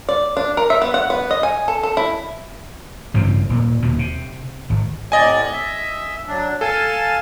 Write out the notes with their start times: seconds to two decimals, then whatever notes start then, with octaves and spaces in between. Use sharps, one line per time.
0.09 D5
0.37 D4
0.57 A#4
0.70 E5
0.82 B3
0.94 F#5
1.10 B3
1.31 D#5
1.43 G#5
1.68 A4
1.83 A4
1.97 E4
3.14 A1 G2 C#3 C4
3.49 D#1 A#2
3.82 D#1 D#2 B2
3.99 C3
4.70 G#1
5.12 A2 C3 D5 D#5 G#5
5.52 E5
6.28 F#3 D4
6.61 A4 F5 G#5 A5